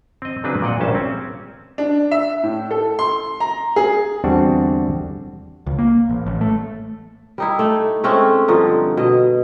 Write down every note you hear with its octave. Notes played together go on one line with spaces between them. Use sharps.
C4 D#5
C#3 F#3 C4 D4 G#4 B4
A#2 D5 D#5 F#5
A#1 G2 C#4 C5 A5
C4 C#4
D4
E5
A2
A4
C6
A#5
G#4
E2 D3 G3 C4 D4 F#4
C#2
A#3
A1
A1
A3
G3 D#4 E4
A3 A4
G#3 A3 C4 C#4
G2 D3 F3 D#4
B2 D#5